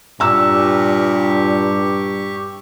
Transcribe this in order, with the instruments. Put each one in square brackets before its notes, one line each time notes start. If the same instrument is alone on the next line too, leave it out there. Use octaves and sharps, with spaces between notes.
[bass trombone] G2 [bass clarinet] A#2 [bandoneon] G4 C#6 [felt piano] A#5 E6